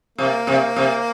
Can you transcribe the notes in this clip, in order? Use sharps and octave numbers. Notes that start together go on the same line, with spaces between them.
C3 A#3
C3
C3